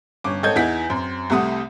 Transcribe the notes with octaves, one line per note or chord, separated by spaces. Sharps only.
G1 C#4 D6
G#1 A4 C#5 D#5 G6 G#6
E2 D#4 E4 F#5 B6
F#2 C4
C2 C3 A3 F#5 D#6